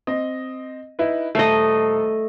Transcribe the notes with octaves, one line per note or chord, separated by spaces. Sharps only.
C4 D#5
D#4 E4 B4
D#1 A3 A4 D#5 C7